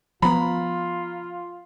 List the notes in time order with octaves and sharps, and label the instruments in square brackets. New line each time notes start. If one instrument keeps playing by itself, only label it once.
[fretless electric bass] F3 B3 [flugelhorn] F4 [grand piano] A#5 B5